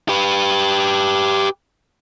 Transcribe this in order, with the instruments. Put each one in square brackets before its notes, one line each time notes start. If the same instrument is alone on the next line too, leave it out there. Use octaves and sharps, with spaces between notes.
[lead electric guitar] G4 B4